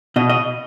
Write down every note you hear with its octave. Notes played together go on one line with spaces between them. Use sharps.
B2 D#5
D#5